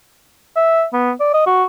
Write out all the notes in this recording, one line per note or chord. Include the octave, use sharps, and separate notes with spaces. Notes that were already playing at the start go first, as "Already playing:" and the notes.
E5
B3
D5
D#5
F#4